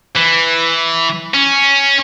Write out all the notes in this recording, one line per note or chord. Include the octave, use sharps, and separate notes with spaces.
E3
C#4